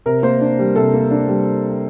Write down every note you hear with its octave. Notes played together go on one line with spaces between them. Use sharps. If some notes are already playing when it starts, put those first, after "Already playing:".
C3 A#4
A#3 C5
D4
G3
C3 A4
A#3
D4
G3